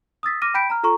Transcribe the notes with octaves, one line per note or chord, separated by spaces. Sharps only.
D#6 E6 A6 B6
D6 F6 A#6 D#7
G5 B5 G6 B6 D7
A#5 F6
F4 A4 A#5 C#6